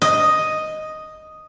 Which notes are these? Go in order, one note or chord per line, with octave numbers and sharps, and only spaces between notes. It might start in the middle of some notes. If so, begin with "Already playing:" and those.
D#5